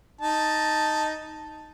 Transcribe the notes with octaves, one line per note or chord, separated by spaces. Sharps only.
D#4 A5